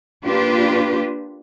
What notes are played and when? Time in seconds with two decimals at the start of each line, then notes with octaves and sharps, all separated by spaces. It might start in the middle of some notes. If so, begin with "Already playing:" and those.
0.25 A#3 D4 F4 G4 B4